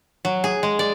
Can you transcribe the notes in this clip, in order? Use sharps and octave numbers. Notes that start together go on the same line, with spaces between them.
F#3
G#4
G#3
D5